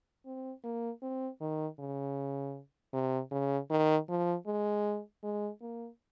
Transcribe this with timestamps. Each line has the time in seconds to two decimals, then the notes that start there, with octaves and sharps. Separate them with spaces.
0.26 C4
0.64 A#3
1.02 C4
1.40 D#3
1.79 C#3
2.93 C3
3.31 C#3
3.70 D#3
4.09 F3
4.47 G#3
5.23 G#3
5.62 A#3